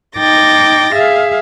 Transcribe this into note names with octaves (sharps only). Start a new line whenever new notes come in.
D#4 G5 D6 A6 A#6
G#4 E5 F5